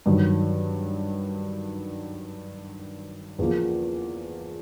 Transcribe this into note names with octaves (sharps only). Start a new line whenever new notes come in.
G2 D#3 F#3
E2 C#3 F3 A#3